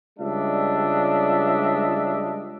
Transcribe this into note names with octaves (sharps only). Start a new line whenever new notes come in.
C#2 G3 D4 D#5 E5